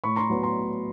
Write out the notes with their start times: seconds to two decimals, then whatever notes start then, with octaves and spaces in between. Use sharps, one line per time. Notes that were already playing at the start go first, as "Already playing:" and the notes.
0.04 A2 B5 C#6
0.16 A#5 C6
0.30 F#3 B3
0.43 A#5 C6
0.57 A2